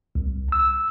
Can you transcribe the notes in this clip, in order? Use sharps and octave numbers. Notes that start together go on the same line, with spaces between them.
C2
E6